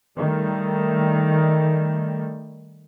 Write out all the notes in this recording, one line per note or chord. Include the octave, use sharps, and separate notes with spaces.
D#3 G3 A3